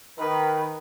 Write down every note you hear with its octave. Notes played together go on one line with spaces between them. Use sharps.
D#3 B4